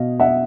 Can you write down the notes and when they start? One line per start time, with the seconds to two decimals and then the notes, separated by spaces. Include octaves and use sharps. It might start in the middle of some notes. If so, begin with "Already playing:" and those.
Already playing: B2 D#5 F5
0.20 E5 F#5